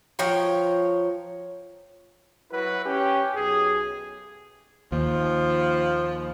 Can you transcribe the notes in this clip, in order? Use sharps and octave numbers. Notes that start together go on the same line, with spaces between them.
F3 C#5 G5 A#5
F#3 E4 F#4 B4
C#4 G4
B1 G#4
D#2 F3